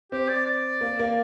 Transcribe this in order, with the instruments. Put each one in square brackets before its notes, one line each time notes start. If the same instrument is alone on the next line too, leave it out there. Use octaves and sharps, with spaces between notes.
[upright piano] C4 [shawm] G4
[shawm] D5
D5
[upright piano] A#3
A#3